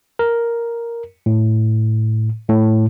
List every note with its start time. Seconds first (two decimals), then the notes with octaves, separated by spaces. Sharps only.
0.19 A#4
1.26 A2
2.48 A2